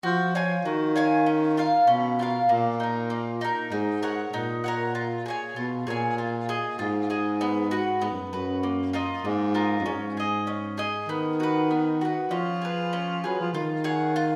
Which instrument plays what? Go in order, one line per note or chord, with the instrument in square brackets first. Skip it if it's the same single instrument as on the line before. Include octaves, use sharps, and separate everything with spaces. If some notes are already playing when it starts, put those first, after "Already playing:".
[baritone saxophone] F3 [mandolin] F#4
[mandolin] C#5 F5 G#5
[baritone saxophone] D#3 [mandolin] F#4
[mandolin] C#5 F5 G#5
C#4
F4 A#4 F5
[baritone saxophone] B2 [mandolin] C#4
[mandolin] F4 A#4 F5
[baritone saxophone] A#2 [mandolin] A#3
[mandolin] D#4 A#4
A#3
D#4 A#4
[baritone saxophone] G#2 [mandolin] D#4
[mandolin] A#4 C#5 F#5
[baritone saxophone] A#2 [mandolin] D#4
[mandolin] A#4 C#5 F#5
F4
G#4 C#5 G#5
[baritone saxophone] B2 [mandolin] F4
[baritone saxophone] A#2 [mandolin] G#4 C#5 G#5
[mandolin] F4
G#4 D#5
[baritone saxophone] G#2 [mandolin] F4
[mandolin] G#4 D#5
B3
F#4 B4
[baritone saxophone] G#2 [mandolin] B3
[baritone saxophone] F#2
[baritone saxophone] F#2 [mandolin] F#4 B4
[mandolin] A#3
F4 A#4 D#5
[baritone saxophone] G#2 [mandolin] A#3
[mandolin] F4 A#4 D#5
[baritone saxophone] F#2
[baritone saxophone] G#2 [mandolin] C#4
[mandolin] G#4 D#5
C#4
G#4 D#5
[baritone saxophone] D#3 [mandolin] B3
[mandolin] F#4 B4
B3
F#4 B4
[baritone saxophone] F3 [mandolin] C#4
[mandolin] G#4 B4
C#4
[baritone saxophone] F#3 [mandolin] G#4 B4
[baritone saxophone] F3
[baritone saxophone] D#3 [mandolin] F4
[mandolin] G#4 C#5 F#5
F4